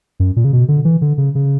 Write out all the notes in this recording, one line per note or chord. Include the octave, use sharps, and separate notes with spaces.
F#2
A#2
C#3
B2
D3
E3
D3
C#3
C#3